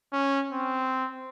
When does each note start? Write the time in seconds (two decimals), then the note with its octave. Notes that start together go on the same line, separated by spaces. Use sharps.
0.13 C#4
0.52 C4